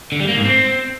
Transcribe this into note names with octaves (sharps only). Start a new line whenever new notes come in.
D3
G3
A#3
G#2
C4